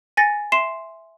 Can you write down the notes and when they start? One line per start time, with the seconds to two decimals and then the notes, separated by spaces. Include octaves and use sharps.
0.17 G#5 A6 A#6 C#7
0.52 E5 C6 C7 E7